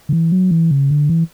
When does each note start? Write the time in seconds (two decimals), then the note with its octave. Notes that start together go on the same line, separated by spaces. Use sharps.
0.09 D3
0.13 E3
0.32 F#3
0.51 E3
0.71 C#3
0.90 D3
1.09 E3